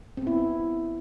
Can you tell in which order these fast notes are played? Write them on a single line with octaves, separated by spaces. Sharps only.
C4 B3 E4